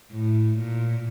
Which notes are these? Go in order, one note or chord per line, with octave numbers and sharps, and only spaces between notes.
A2
A#2